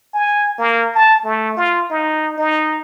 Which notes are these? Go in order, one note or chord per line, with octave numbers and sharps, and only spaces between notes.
G#5
A#3
A5
A3
F4
D#4
D#4